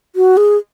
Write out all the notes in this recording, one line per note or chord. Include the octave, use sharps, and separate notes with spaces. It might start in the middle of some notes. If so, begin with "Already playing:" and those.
F#4
G#4